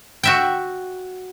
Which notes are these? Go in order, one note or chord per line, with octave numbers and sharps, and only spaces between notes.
F#4 E5 G5